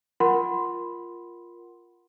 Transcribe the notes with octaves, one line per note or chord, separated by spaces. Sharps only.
F4 A#4 F#5 B5 C6